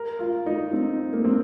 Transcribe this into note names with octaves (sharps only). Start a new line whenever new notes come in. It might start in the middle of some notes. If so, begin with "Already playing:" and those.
Already playing: A#4
F4
D#4
C4
A#3
C4